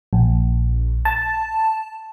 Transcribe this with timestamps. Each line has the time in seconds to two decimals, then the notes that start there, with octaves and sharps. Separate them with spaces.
0.13 A#1
1.05 A5